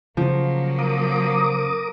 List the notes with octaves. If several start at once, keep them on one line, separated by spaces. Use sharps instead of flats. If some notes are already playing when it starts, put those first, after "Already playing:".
C#3 F3 F#3 A#3
A#4 D6 D#6